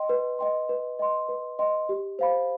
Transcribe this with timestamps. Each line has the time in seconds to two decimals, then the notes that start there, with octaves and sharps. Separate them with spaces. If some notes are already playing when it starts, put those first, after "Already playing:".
Already playing: D#5 G5 C6
0.09 B4
0.39 D#5 G5 C6
0.69 B4
0.99 D#5 G5 C6
1.29 B4
1.59 D#5 G5 C6
1.89 G4
2.19 C5 F5 B5